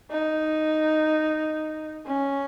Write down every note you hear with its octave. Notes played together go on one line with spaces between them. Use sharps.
D#4
C#4